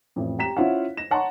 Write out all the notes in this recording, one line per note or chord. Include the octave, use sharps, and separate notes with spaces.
A1 F2
G4 A#5 B6 E7
C#4 E4 F4 C5 F5 F#5
A#6 E7
C#5 F#5 A5 A#5 C6 C#6